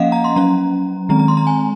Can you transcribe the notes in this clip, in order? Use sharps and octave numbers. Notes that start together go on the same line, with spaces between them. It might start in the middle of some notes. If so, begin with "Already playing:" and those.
Already playing: F3 A#3 C#4 D#5 F5 F#5
A#5
C6
F#3 C#4 A#5
D#3 G#3 C4 A#5
A#5
C6
A#5
G#5